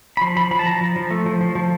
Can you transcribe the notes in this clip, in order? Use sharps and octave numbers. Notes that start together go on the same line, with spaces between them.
B5
F3 C6
F3 B5
F3 B5
A5
F3 A#5
F3
F3
A3
F3
F3
F3